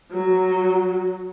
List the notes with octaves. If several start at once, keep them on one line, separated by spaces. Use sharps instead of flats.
F#3